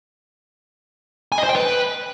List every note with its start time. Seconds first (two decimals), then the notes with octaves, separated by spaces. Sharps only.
1.32 G#5
1.38 D#5
1.44 C5
1.49 G5
1.55 B4